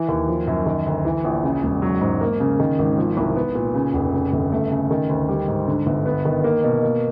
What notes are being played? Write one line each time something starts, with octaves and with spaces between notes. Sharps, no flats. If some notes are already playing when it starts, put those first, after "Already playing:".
Already playing: E3
D#2
F3
F#2
D#3
D2
E3
A#1
C#3
E1
F#3
G#2
A#3
C#3
D#3
G#1
F3
C2
B3
A#2
C#3
F1
C#3
G1
A3
C#3
D#3
D2
G3
G#2
D3
G1
B3
D#3
A#3
B2
A#3